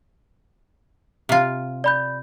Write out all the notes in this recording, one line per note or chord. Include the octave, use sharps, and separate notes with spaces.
C3 F4
D5 B5 G6